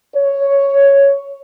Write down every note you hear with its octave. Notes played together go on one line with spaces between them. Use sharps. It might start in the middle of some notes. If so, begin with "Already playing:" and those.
C#5